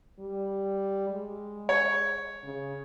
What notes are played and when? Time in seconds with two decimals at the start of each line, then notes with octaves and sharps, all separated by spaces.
0.20 G3
1.10 G#3
1.69 C#5
2.44 C#3